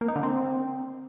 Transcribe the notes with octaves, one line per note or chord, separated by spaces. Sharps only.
A#3
D#4
D3
C4